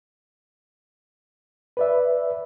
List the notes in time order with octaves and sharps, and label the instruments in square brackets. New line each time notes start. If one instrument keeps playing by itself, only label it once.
[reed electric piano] B4 D5 E5